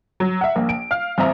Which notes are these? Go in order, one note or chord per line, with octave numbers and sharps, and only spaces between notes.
F#3
E5 F#5
A#1 A#3
D7
F5 F6
A1 C4 E5 A#5